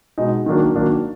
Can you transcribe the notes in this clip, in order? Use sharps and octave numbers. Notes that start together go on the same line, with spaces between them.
B2 G#3 D#4
D#3 F#3 A#3 D4
D#3 F#3 A#3 D4